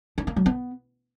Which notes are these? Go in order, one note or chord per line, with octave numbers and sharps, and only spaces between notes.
D4
A#3
F#3
B3